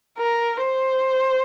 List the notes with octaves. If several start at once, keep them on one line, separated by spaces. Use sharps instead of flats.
A#4
C5